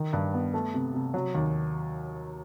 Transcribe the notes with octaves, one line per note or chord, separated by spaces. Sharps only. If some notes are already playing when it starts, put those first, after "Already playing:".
Already playing: D#3
G2
B3
A3
C3
C3
F#3
D#2